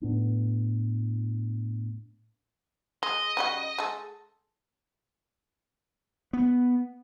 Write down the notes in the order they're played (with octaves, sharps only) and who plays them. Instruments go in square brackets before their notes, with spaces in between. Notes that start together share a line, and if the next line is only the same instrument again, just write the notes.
[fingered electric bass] A2 B3 D4
[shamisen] G#3 [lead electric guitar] D#5
[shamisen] C#3 G3 F#4
G#3 A4
[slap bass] B3